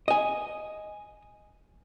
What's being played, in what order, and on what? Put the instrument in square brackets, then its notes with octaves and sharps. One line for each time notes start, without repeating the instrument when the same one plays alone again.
[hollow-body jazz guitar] D#5 G#5